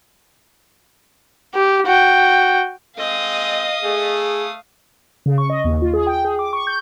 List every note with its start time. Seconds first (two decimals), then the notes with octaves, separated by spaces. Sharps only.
1.55 G4
1.86 F#4 G5
2.98 G#3 C4 D#5 F5 D#6
3.82 A3 G#4
5.26 C#3
5.38 C#6
5.50 D#5
5.64 D#2
5.82 F4
5.94 G#4
6.07 G5
6.25 G#4
6.39 D6
6.53 C#6
6.67 G6